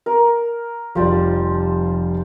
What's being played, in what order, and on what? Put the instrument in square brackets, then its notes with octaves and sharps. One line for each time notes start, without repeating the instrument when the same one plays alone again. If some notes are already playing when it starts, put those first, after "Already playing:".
[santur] A#4
[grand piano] F1 G3 D5 [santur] F3 C5 A5